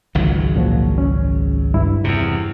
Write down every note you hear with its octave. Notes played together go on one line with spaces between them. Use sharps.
G#1 C#2 F#3
A#2 F3 F#4
C#4
G2 E4
E2 C3